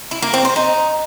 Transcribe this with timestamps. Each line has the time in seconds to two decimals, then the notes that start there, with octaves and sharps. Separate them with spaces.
0.11 E4
0.22 A#3
0.34 C4
0.45 C5
0.56 D#4